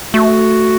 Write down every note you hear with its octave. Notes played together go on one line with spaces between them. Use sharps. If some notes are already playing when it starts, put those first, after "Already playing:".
A3 F#4